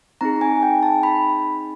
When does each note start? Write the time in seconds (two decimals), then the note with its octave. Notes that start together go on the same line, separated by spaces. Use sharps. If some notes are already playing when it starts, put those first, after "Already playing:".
0.21 C4 D#4 G#4 A#5
0.41 G#5
0.63 G5
0.83 A5
1.03 B5